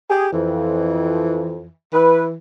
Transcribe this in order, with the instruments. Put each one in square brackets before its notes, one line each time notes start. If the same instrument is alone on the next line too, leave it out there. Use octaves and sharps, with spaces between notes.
[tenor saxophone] G4 [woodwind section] G#4
[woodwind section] F2 [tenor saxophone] E3
[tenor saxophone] E3 [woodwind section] B4